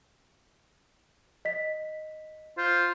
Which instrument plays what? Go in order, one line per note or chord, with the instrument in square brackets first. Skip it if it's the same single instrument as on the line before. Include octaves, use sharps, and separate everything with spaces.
[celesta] D#5 B6
[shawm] F4 [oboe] C5